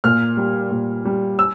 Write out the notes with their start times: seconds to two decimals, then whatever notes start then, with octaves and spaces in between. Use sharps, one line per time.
0.04 A#2 F6
0.37 G3
0.71 A#2
1.05 G3
1.39 E6